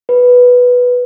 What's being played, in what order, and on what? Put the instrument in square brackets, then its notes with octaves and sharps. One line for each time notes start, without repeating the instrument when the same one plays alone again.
[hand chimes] B4